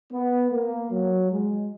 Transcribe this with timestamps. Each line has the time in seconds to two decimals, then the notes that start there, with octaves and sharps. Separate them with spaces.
0.12 B3
0.52 A#3
0.92 F#3
1.31 G#3